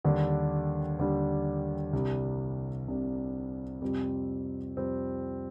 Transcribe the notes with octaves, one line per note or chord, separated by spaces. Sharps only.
D#2 D3 G3 D4
D#2 D3 G3 D4
C2 C3 G3 D4
C2 C3 G3 D4
F2 C3 G3 C4
F2 C3 G3 C4